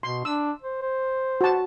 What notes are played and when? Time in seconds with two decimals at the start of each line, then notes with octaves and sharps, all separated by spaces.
0.03 B2 C6
0.25 D4 E6
0.62 C5
0.82 C5
1.41 F#4 A5